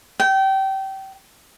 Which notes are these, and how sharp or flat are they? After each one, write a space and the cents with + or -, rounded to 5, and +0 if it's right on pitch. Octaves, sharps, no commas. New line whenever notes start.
G5 -25